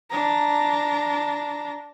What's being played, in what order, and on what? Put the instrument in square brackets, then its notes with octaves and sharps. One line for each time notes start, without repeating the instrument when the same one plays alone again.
[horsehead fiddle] D4 A#5